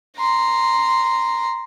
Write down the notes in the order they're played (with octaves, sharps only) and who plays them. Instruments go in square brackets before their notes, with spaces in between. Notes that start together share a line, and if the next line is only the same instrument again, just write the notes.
[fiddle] A#5 C6